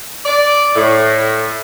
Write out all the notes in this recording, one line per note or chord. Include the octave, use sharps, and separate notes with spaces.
D5
A2